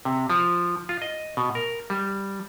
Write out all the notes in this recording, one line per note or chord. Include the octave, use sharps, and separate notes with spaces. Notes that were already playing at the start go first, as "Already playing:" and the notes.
C3
F3
F4
D#5
B2
A#4
G3